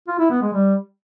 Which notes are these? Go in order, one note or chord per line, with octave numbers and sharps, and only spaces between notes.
F4
E4
B3
G#3
G3